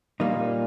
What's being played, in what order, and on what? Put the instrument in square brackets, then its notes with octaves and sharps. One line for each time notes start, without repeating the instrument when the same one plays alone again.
[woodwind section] A#2 [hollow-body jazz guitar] G3 A#3 D#4